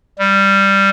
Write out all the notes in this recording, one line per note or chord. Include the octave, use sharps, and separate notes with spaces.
G3